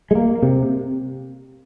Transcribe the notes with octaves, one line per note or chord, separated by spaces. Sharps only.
G#3
A#3
C3